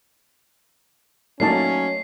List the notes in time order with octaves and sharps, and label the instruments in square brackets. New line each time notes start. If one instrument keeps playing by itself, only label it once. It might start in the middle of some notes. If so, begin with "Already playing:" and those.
[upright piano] F#3 A#3 D#4 [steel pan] A3 D5 A5 [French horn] C#4 [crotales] C7